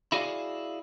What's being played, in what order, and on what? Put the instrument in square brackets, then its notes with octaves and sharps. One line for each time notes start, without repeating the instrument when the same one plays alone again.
[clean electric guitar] E4 F#4 G#4 D5 E5 F5